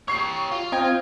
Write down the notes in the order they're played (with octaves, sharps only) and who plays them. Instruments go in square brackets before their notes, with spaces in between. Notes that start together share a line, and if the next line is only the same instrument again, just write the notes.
[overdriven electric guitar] G4 C#5 [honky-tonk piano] C#6 C7
[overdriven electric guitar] F4
[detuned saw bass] C4 [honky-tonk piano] D#5 G5 G#6